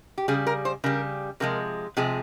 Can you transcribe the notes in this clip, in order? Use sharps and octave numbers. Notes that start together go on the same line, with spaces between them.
G4
C#3 G3 G#4
A#4
C5
C#3 G3 A#4
C3 F3 G#3 A#4
C3 F3 G#3 G#4